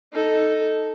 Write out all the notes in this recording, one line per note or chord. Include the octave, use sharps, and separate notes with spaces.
D#4 A4